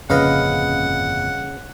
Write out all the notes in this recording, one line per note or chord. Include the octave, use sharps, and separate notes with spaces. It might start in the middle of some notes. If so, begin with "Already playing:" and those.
G1 F2 A#2 C#3 B4 D#5 F5 F#5